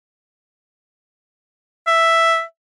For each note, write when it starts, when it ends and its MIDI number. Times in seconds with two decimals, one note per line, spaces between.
1.87 2.43 76